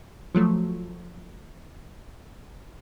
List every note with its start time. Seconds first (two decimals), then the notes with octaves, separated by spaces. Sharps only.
0.35 F3 F#3 A3